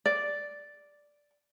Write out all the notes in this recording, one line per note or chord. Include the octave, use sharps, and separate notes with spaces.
D5